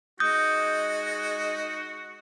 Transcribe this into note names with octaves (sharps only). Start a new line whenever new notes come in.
G#3 D#4 F#4 D#6 G6